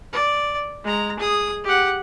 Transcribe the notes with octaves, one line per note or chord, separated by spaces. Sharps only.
D5
G#3 A#5
G#4 D#6
G4 F#5